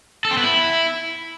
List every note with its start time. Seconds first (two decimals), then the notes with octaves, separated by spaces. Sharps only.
0.25 A4
0.31 C4
0.37 B3
0.43 E4